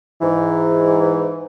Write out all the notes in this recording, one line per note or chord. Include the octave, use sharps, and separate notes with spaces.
G#2 E3